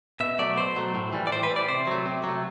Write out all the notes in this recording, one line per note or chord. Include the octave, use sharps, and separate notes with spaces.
B2 E5
F#3 A3 D5
B2 C5
F#3 A3
A2
E3 G3
D5
A2 C5
B4
E3 G3
D5
C3 C5
F#3 A3
C3
F#3
A3